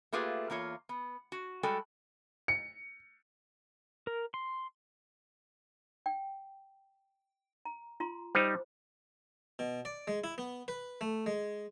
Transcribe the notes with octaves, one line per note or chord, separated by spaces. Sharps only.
A3 A#3 F4 G4 G#4 B4
E2 A#3 F4 C#5
B3
F#4
G3 G#3 F#4 A4 G5
C#7
A#4
C6
G5
A#5
F4 A#5 C6
G3 D#4 C5
B2
D5
G#3
E4
B3
B4
A3
G#3